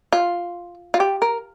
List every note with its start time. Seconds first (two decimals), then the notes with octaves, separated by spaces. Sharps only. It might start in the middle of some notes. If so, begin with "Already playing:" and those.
0.12 F4
0.94 F4
1.00 G4
1.22 A#4